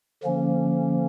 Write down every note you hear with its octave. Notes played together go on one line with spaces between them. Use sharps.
D3 F3 A#3 C#4